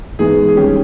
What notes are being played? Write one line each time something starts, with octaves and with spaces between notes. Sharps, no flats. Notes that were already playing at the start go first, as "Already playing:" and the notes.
G#2 E3 G#3 B3 G#4
G#4
D#3 G3 C#4 G4